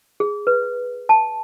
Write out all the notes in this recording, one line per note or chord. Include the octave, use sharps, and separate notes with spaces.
G#4
B4
A5